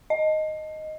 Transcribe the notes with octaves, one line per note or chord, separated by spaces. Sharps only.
D#5